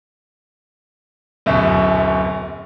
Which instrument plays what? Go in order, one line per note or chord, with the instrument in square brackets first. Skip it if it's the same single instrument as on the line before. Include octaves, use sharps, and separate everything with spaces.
[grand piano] D1 F#2 B2 E5